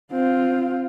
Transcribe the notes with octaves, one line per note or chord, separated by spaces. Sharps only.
C4 F4